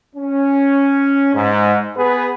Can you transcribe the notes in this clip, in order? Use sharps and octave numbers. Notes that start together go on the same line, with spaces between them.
C#4
G#2
B3 G#4 B4